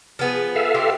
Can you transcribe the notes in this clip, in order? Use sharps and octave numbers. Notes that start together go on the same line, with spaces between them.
F3 B3 G#4
A4 E5 F5
F#4 G4 C5